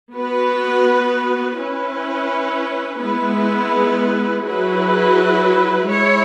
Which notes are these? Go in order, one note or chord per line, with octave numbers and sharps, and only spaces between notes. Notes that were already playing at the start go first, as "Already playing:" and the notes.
B3 F#4 B4
C#4 E4 B4
G#3 B3 E4 B4
F#3 E4 G#4 B4
G#3 E4 C#5